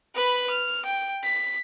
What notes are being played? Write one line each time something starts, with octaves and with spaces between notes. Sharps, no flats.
B4 B5
F6
G5
B6